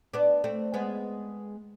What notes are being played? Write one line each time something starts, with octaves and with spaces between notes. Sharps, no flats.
B3 D4
A3 C4
G#3 B3